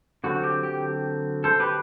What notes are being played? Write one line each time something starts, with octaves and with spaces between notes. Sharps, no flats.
D3 F#3 C4 F#4
G4
G4
A4 C5
G4 B4